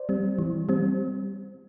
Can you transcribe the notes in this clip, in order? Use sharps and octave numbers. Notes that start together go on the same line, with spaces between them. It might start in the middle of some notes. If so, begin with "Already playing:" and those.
Already playing: C5 D5
G3 C4
E3
G3 C4